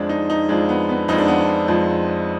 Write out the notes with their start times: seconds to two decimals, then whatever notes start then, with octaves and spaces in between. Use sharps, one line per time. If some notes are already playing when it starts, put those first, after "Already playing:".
Already playing: F2 F3 G#3 D4
0.09 D#4
0.30 D#4
0.49 F2 F3 G#3 D4
0.69 B3
0.89 B3
1.08 F2 F3 G#3 D#4
1.18 D4
1.28 B3
1.38 D4
1.68 F2 F3 G#3